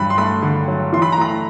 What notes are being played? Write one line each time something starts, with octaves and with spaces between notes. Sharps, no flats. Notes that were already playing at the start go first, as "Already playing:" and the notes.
Already playing: G2 F#3 B5
C6
A3 B5
D3
F#3
E3 C6
B5
A#5
A3 B5